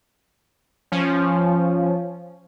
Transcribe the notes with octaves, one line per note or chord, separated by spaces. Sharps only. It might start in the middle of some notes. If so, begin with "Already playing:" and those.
F3 C#4